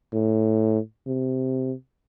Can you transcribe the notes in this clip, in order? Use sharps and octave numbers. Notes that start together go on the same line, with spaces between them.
A2
C3